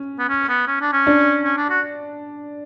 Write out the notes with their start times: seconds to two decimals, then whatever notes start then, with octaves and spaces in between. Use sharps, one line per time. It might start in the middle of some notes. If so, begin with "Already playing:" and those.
Already playing: C#4
0.19 B3
0.29 C#4
0.49 B3
0.68 C#4
0.81 D4
0.93 C#4
1.07 D4
1.44 C#4
1.57 D4
1.70 F#4